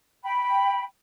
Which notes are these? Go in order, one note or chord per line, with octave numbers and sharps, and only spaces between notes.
G5 B5